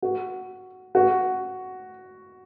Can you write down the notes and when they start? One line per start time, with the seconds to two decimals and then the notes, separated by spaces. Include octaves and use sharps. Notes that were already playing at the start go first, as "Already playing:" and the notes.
0.02 F#4
0.95 F#4